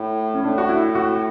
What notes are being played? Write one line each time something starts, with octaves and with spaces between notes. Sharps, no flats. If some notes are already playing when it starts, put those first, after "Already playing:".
Already playing: A2
C#4
A2 D4
F#4
E4
F#4